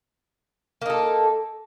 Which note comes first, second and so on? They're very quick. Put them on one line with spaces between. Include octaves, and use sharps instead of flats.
A#3 D#4 A4